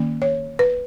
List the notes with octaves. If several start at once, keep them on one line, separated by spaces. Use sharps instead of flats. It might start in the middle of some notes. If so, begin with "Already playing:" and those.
Already playing: D#3 A#3 C#4
C#5
B4